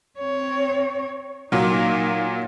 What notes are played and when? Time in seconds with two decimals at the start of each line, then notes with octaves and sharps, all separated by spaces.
0.19 C4 C#5
1.52 A#2 F#3 A#3 D#4